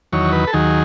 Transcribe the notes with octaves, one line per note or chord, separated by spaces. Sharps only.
E2 D#3 F#3 C#5
B4
A4
D#2 D#3 F#3 G#4